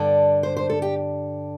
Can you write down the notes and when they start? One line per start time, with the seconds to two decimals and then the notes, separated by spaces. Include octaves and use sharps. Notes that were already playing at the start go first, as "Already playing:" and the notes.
Already playing: G2 D3 D5
0.43 C5
0.57 C5
0.70 A4
0.82 G4